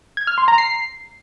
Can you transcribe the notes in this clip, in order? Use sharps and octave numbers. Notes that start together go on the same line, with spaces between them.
G#6
F6
C6
A#5
C7